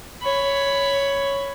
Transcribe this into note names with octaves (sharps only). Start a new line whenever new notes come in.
C#5 B5